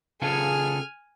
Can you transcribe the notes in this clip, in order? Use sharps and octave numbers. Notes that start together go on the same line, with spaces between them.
C#3 F4 G#4 A4 G#5 F6